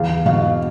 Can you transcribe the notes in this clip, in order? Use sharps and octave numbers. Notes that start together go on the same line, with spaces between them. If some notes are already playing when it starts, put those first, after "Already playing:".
Already playing: E2 F5
B2 F5